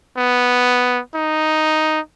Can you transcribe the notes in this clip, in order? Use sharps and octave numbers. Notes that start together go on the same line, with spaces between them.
B3
D#4